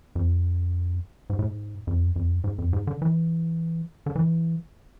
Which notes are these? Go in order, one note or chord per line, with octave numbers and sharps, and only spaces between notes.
F2
G#2
A2
G#2
F2
F2
G#2
F2
G#2
D3
E3
D3
E3